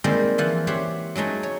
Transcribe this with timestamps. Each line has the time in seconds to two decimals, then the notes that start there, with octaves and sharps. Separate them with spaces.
0.04 D#3 G3 G#3 A#3 C4
0.38 E3 F3 F#5
0.67 G4 C5 C#5 E5 F#5
1.16 F#3 G#3 A3 D#4
1.43 C#5